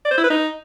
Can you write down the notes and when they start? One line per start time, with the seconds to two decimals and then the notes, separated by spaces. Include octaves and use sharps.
0.05 D5
0.11 C5
0.17 E4
0.24 B4
0.30 D#4